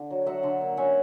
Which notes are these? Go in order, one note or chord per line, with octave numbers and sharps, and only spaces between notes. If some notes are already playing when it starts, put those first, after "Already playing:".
Already playing: D3
F#3
F#3 E5 F#5
D3
A#3
C#4 E5 F#5